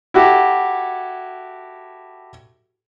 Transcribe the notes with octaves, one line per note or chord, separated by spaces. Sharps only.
E4 F#4 G4 A4